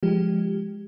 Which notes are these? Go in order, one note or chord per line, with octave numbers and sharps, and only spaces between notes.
F3 G#3 G4